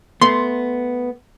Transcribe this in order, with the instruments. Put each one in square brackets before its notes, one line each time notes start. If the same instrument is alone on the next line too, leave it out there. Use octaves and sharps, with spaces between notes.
[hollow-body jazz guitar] A3 B3 [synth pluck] C6